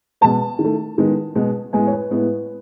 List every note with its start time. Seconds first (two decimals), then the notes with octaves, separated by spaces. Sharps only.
0.21 B2 G#3 B3 A5
0.59 D#3
0.64 A3
0.98 D#3 G#3 B3
1.35 B2 G#3 B3
1.73 A2 G#3 B3 G#5
1.87 C#5
1.93 B4
2.11 A2 G#3 B3